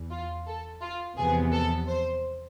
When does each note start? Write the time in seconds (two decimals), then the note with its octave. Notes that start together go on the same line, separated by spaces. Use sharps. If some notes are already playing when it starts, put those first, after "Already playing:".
Already playing: E2
0.10 F4
0.47 A4
0.81 F4
1.17 E2 C3 F3 B3 G#4
1.53 A4
1.88 C5